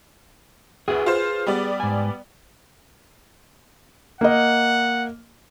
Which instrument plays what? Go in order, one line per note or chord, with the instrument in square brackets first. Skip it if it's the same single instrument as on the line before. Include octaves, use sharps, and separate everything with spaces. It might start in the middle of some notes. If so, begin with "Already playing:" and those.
[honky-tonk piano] D2 [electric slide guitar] G#4 B4
[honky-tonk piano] F4 C5
G3 B3 D5
[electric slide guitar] G#2 G#5
[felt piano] A#3 D#5 [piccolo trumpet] F#5